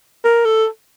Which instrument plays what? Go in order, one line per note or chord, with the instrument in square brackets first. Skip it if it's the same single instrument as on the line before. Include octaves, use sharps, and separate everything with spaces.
[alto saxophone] A#4
A4